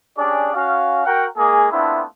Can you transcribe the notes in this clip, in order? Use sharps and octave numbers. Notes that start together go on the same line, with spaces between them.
C#4 D4 G4 G#4 D5
C#4 F#4 F5
F#4 A#4 F#5 G5
G#3 A#3 G#4
A3 B3 C4 D4 E4 F4